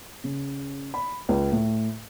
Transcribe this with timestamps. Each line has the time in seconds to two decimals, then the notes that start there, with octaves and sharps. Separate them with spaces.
0.24 C#3
0.94 B5
1.29 C#2
1.52 A2